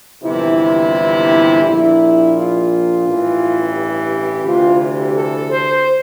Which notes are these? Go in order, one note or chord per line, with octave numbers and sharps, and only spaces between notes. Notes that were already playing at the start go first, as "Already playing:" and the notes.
G1 F2 C3 E3 E4
A#1 A#2 E4
F4
A1 G2 E3
G4
D2 C3 E3 F4
G4
A4
C5